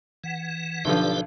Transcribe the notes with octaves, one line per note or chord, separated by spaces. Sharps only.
E3 F#5
B1 D3 F3 G4 B4 D5